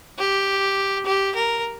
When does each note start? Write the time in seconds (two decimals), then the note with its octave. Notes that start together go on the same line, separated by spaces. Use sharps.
0.18 G4
1.05 G4
1.35 A#4